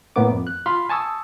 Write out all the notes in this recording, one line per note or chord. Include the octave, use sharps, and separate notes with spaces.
A2 A#3 B3 D6
F2
F#6
F4 F5 B5 C6
G#5 A5 C#6 D#6 E6